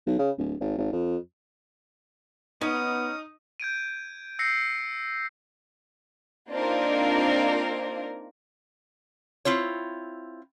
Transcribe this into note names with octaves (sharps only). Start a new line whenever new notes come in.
B1
C#3
D1
G#1
G#1
F2
B3 C#4 D#4 D#6
G6 G#6 D7 D#7
E6 G6 A#6 C7 C#7
A#3 C4 D4 D#4 F4 A#4
C4 E4 F4 C#5